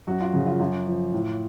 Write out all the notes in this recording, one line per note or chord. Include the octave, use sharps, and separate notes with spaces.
F#2 F#4
F4
C#3 F3
F4
F#2 F4
F3
A2